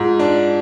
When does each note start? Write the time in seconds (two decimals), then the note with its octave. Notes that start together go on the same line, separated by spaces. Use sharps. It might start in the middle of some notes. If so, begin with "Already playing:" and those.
Already playing: G#2 F4
0.19 D4